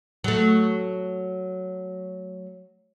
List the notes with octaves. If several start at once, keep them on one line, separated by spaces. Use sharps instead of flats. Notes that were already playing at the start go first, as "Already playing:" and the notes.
F#3 A3